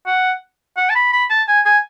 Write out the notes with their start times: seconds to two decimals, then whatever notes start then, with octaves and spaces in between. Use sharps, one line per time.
0.07 F#5
0.77 F#5
0.90 A5
0.95 B5
1.13 B5
1.30 A5
1.48 G#5
1.66 G#5